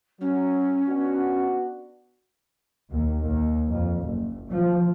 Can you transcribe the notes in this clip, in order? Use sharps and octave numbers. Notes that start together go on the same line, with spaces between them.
F#3 C#4
B3 D4 F#4
D#2
D#2
F2
F#1
F3